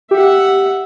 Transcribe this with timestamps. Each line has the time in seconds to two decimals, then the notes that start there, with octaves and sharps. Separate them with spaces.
0.11 G4 E5 F#5